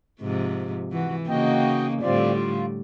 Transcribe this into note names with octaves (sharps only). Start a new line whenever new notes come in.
G#2 C3 F3
E3 F#4
C#3 A#3 D#4 F#4 D#5 G5
A2 D3 G3 C4 F4 D5
F4